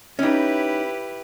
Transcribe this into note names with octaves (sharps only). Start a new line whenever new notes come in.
C#4 D#4 E4 G4 B4